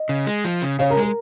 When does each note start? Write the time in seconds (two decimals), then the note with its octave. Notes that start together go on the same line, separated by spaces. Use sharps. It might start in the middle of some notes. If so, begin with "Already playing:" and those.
Already playing: D#5
0.09 C#3
0.27 G#3
0.44 F3
0.62 C#3
0.79 C#3 C#5 F5
0.90 A#4
0.97 G#3
1.02 A#4